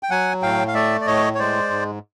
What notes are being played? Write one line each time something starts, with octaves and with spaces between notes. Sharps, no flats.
G5
F#3 F#5 G#5
A2 F5 G5
F5
A3 D5 E5
D5
A2 C#5 D#5
C#5
G#3 C5 D5
G#2